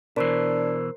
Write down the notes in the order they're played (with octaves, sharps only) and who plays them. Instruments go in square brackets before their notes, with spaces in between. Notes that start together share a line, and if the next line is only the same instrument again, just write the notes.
[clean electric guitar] B2 E3 [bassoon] D4 [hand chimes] A#4 C5 C7